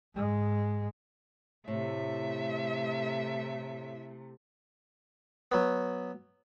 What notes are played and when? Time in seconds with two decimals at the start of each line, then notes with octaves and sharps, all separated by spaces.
0.15 G#2 G#3
1.68 A2 C3 A3 E5
5.52 F#3 B3